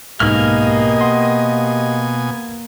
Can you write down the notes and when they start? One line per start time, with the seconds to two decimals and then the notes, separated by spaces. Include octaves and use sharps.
0.20 B1 G#2 B2 A#3 G4 D#5 G#5 F6
1.01 F#5 C6